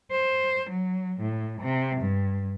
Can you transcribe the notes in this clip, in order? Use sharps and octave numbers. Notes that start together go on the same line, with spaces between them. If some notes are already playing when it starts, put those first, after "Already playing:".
C5
F#3
A2
C3
G2